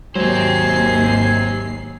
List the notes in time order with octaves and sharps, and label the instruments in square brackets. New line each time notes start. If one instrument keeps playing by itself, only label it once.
[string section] G#1 D#2 C7 [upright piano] F#3 [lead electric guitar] G4 C5 [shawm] G#5